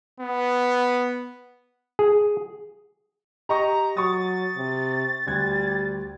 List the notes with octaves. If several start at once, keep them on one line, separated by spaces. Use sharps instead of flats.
B3
G#4
G4 D#5 A#5 C#6
F#3 C#6 D#6 A6
C3
D2 G3 F#6 G#6